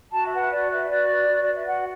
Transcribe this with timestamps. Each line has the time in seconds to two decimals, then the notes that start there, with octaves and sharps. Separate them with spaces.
0.12 F#4 A5
0.25 E5
0.32 B4 F#5
0.42 E5
0.51 F#4 D5
0.70 B4 E5
0.89 F#4 D5
1.09 B4
1.28 F#4
1.43 B4 D5
1.55 E5
1.65 F#4 F#5